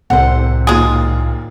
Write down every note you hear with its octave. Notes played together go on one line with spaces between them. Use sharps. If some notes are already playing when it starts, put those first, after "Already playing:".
C2 A2 C3 A4 C5 F#5
D#2 A#2 G#3 F4 G#4